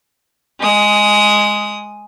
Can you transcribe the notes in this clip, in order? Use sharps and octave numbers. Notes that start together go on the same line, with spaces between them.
G#3 D#6